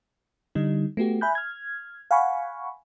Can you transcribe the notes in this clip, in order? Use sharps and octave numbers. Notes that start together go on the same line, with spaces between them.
D3 G3 D#4
A3 B3 F#4 G4
E5 G#5 B5 F#6 G6
F6 G#6
F5 F#5 G#5 B5 C#6